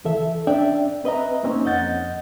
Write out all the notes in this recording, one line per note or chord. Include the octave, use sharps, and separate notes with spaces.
C#2 E3 A4 E5
C#4 D4 D5 E5 G5
C4 B4 D#5 E5 A#5
A#3 C4 C#4 D#4
F2 D#5 F#5 G6 A6